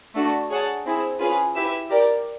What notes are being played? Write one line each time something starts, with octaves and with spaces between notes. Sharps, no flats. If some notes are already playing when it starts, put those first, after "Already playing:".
A3 D4 F#4 A4
G#4 C#5 F#5 A5
C4 E4 G#4
C#4 F4 G#4 B4
E4 G4 B4 E5
G4 A#4 D5